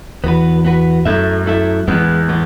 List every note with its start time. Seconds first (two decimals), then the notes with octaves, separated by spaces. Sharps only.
0.24 E2 B3 F#4 B4
0.65 B3 F#4 B4
1.05 F#2 A3 E4 A4 E5
1.46 A3 E4 A4 E5
1.87 E2 A2 E3 G#3 B3
2.28 A2 E3 G#3 B3